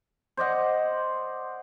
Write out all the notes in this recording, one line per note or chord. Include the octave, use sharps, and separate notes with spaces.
C5 D5 D#5 F#5